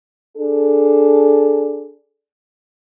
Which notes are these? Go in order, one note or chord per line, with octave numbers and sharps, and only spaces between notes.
D4 G#4 A4